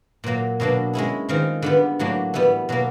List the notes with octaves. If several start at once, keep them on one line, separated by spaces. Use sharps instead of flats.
A#2 F#3 A#3
B2 F#3 A#3 D4
G#3 C#4 E4 G#4
D#3 G#3 C4 F4
D3 G3 B3
A2 F#3 A#3 D4
E3 G3 B3
B2 F#3 A#3